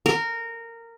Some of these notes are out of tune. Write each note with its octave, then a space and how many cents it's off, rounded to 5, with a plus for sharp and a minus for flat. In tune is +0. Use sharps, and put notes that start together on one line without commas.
A#4 -15